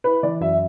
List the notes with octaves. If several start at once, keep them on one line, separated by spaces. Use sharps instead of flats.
E4 B4
E3 D5
F#2 E5